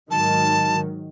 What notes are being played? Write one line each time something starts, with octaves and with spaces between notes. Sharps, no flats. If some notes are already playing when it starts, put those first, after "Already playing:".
G#2 D#3 F#3 A5